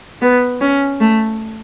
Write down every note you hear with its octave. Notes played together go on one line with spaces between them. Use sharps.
B3
C#4
A3